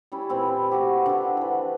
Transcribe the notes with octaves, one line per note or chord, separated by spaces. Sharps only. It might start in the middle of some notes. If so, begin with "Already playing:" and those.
G3 C#4 E4
A#2 E3 C4 E4
A3 F#4 G4
D3 F3
E3 B4